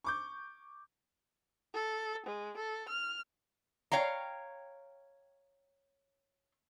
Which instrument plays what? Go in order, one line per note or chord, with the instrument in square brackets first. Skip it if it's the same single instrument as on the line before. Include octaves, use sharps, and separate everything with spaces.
[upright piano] C#6 D6 G6
[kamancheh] A4
G#3
A4
F6
[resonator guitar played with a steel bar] C#5 F5 G5 A#5